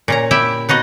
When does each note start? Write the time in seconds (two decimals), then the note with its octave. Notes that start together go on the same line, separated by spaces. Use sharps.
0.08 A#2 C#4 A#5
0.31 E4 G4 E5
0.69 B3 D#4 F#4 D#5